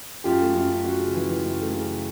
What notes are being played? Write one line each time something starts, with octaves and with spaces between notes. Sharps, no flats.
F#2 F4 G4
A3
F#2
F#2
F#2 F#4
C#3
E3
E3
F#2
A3
C#3